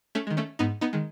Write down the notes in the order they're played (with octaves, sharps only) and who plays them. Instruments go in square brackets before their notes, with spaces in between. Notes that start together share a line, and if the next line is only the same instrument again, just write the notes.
[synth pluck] A3 C#4
D#3 G#3
A3 C#4
G#2 B3 D#4
B3 D#4
D#3 G#3